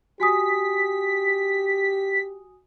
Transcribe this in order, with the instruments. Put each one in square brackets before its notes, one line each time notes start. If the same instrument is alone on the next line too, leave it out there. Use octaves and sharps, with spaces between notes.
[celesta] F#4 G#5 D#6 [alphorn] G4 [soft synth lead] B6